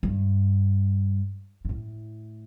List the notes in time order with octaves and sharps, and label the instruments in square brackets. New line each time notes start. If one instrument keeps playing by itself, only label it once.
[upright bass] G2
G2
A2